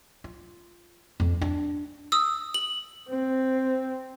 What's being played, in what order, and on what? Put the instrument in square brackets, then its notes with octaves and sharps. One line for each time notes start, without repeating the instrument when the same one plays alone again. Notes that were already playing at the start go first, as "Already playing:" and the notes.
[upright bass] F4
F2
D4
[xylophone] D#6 E6
F#7
[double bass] C4